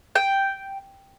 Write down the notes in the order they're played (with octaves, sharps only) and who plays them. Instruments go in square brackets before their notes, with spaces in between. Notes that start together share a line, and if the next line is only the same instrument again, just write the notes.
[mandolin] G5